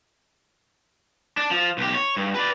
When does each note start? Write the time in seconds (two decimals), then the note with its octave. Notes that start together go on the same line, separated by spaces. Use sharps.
1.37 D4
1.51 F3
1.78 B1 G4
1.95 C#5
2.17 G2
2.35 B4 D5